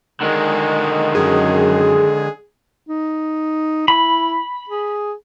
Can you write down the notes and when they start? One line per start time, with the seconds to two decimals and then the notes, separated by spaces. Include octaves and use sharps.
0.21 D3 D#3 G#3
1.15 F#2 G#4
2.88 D#4
3.88 E4 B5
4.69 G#4